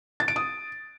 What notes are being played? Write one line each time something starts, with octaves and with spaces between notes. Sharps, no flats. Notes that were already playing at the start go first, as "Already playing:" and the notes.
A6
D7
D#6